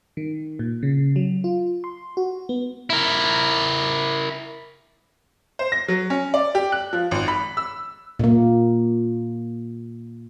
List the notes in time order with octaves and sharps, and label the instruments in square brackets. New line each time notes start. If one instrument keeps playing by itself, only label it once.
[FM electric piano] D#3
A#2
C#3
F#3
F4
C6
F#4
B3
[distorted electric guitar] E4 A#4
[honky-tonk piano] C5
A#6
F#3
C#4
D5
G4
F#6
F3
G#1
B5
E6
[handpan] A#2 A#3